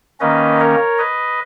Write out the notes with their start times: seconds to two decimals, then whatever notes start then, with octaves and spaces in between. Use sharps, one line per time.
0.20 D#3 A#3 C#4 B4 D#5
0.59 A#4 C#5
0.98 B4 D#5